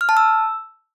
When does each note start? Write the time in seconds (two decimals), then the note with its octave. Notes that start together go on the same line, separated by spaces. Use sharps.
0.01 F6
0.09 A5
0.17 E6